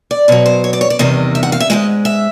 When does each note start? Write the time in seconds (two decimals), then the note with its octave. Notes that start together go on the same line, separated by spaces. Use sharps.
0.11 D5
0.28 B2 F#3 C#5
0.46 C5
0.64 C#5
0.73 D5
0.81 C#5
0.90 D5
0.99 E2 C3 D#3 G3 D#5
1.35 E5
1.43 F#5
1.52 F5
1.60 E5
1.70 G#2 F3 G#3 D#5
2.05 E5